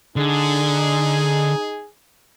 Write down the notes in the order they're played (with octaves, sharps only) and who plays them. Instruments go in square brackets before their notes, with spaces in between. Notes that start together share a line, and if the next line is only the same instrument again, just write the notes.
[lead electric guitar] D3 [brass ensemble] D#4 G#4